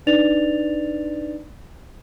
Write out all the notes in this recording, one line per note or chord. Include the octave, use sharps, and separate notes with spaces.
D4 D#4 B4 D5 A6 F7